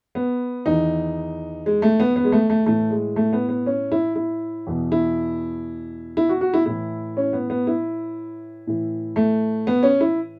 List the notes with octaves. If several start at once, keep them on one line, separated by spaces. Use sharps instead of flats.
B3
E2 D#3 D#4
G#3
A3
B3
B3
G#3
A3
A3
A2 E3 A3
G#3
A3
B3
B3
C#4
E4
E4
E2 B2
E4
E4
F#4
F#4
E4
A2 E3 E4
C#4
B3
B3
E4
A2 E3
A3
B3
C#4
E4